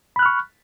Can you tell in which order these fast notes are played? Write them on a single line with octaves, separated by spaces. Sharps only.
B5 F#6 F6 C#6